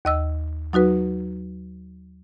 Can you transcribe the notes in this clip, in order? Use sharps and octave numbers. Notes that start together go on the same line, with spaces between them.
D#2 D#5 E6
F#3 D#4 F#4 B4